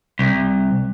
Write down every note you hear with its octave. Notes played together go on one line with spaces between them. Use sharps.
C2